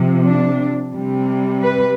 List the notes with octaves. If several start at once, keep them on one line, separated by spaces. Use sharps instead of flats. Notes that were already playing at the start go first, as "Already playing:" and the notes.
Already playing: C3 F3
D4
C3 G3
B4